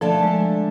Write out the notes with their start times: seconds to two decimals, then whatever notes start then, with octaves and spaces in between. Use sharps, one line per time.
0.01 D3 F3 A3 D4 A4
0.23 G#3